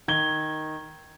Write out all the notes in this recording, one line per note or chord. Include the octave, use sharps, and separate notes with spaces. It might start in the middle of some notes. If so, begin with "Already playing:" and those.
D#3 G#6 G7